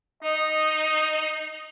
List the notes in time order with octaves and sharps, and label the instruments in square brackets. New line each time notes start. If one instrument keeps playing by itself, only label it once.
[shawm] D#4 [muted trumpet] D#5